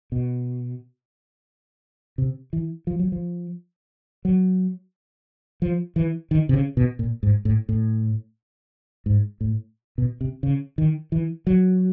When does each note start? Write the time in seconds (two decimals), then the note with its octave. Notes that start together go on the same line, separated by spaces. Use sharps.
0.12 B2
2.18 C3
2.53 E3
2.87 F3
2.99 F#3
3.12 F3
4.25 F#3
5.62 F3
5.96 E3
6.31 D#3
6.49 C3
6.54 C#3
6.77 B2
6.99 A#2
7.23 G#2
7.45 A2
7.69 A2
9.06 G#2
9.41 A2
9.98 B2
10.21 C3
10.43 C#3
10.78 D#3
11.12 E3
11.47 F#3